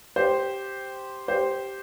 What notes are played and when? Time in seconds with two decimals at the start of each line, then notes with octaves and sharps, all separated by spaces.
0.16 G4 C5
1.28 G4 C5